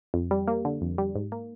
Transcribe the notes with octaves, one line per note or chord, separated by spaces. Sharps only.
F2
G3
A#3
D3
F2
G3
G#2
A#3